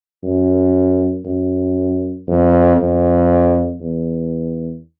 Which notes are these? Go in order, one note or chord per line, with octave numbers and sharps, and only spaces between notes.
F#2
F#2
F2
F2
E2